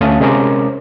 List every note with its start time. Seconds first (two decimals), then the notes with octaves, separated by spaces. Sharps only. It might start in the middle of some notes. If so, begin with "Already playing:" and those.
0.01 D2 A3 C#4 F5 A5 D#6
0.20 C3 G#3 C#4 A#4 C5 D6